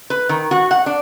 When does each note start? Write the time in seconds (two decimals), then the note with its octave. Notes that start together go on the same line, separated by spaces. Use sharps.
0.10 B4
0.29 D#3
0.51 F#4
0.71 F#5
0.86 D4